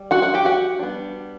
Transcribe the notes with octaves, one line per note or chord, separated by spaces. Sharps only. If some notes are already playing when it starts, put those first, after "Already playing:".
Already playing: G3
F#4 F#5
F#4 F#5
G4 G5
F#4 F#5
G3 B3 D4